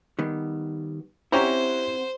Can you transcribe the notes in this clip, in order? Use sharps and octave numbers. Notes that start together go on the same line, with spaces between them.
D#3 G3 B3
C4 C#4 E4 G4 C5 F#5 A#5